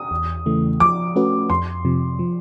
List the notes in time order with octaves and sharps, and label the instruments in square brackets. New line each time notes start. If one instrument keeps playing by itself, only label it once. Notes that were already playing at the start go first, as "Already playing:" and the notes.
Already playing: [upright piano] D#6
[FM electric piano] E2
C#3 E3 A3
[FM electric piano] F3 [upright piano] D6
[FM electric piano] A3 C#4 F#4 B4
[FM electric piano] F2 [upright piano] C6
[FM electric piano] C3 F3
F3